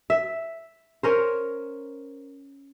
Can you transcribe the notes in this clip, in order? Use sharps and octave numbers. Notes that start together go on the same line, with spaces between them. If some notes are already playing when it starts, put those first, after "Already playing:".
E5
C#4 A#4 C5